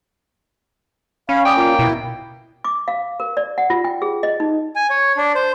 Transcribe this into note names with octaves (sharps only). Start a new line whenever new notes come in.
C#4 F5 B5
D5 G5 D#6
A#3 F4
B2 E4
D6
F5
A#4
D5
F#5
F4
G5
G#4
D#5
D#4
G#5
C#5
D4
C5